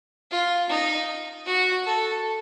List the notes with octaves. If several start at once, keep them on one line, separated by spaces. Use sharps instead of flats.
F4
D#4
F#4
A4